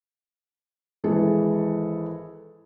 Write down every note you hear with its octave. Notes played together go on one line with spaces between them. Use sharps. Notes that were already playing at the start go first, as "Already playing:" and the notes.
G#1 E3 G#4 A4